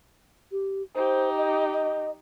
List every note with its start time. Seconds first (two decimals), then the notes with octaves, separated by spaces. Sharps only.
0.52 G4
0.95 D#4 G4 C5
1.38 D#5
1.73 D#5